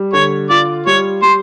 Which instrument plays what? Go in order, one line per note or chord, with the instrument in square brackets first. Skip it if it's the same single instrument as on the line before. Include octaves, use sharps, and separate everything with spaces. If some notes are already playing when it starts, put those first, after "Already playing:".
Already playing: [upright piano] G3
[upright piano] D3 [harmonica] C#5
[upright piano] F4 [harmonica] D5
[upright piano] G3 [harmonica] C#5
[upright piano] G3 [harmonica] C5